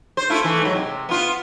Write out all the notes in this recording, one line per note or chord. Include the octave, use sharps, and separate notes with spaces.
C5
A3 E4 F4
E3 A3
G#2 F#3
C3
B3 F4